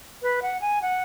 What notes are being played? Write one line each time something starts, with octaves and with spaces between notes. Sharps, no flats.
B4
F#5
G#5
F#5